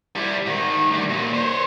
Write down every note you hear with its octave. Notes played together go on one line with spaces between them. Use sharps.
G3 E4
G#2 D#3
D2 G3
D#2 A#2
C5 C#5